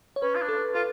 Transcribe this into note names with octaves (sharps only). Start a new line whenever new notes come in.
C#5
C#4 B4
F4
D4
A4
F4 A4